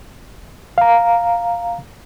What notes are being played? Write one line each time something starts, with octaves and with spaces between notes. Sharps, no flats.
F5 A#5